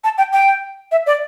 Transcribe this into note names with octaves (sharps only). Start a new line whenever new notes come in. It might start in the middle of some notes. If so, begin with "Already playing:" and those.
A5
G5
G5
E5
D5